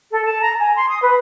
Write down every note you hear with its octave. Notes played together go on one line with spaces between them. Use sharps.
A4
A5
A#5
G#5
C6
D#6
B4